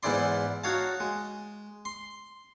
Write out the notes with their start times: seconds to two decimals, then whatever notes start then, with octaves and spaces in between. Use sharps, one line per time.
0.03 E2 G#2 E3 E4 D5 C6
0.64 D#4 F#4 C#5 F5 A5
1.00 G#3
1.85 C6